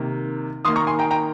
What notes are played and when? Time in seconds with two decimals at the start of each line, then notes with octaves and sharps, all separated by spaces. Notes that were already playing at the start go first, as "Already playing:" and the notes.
Already playing: C3 D#3 A#3
0.65 D#3 C6 D#6
0.68 A#3
0.76 A#5 C#6
0.87 G#5 C6
0.99 G5 A#5
1.11 G5 A#5